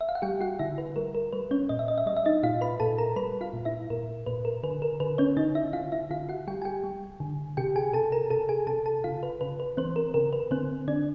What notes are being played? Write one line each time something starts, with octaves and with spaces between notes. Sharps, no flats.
E5
F5
F#5
G3 G4 G5
F#4 F#5
D3 E4 E5
B4
G3 A#4
A#4
G3 B4
C#4 C#5
A#2 D#5
E5
D#5
E5
G3 D#5
E5
D#4 D#5
A#2 F4 F5
B4 B5
A#2 A4 A5
A#4 A#5
G3 B4 B5
F4 F5
A#2
E4 E5
A#2 A#4
A#2 B4
A#4
D3 B4
A#4
D3 B4
C#4 C#5
D3 D#4 D#5
E4 E5
D3 F4 F5
E4 E5
D3 F4 F5
F#4 F#5
G3 G4 G5
G#5
G4 G5
G3
D3
C3 G4 G5
G#4 G#5
C3 A4 A5
A#4 A#5
C3 A4 A5
G#4 G#5
C3 A4 A5
A4 A5
C#3 F4 F5
B4
C#3 B4
B4
E3 C4 C5
A#4
C#3 A#4
B4
D3 C4 C5
D3 D4 D5